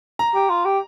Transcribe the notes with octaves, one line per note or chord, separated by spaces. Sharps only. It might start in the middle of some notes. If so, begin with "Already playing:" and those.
A#5
G4
F4
G4